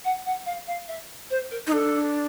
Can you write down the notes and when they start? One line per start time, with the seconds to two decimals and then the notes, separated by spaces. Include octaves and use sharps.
0.05 F#5
0.26 F#5
0.46 F5
0.67 F5
0.88 E5
1.30 C5
1.51 A#4
1.67 D#4
1.72 D4 A4